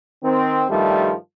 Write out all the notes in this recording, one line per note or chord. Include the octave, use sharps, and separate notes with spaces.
D#3 C4
G2 D#3 F3 G3 A3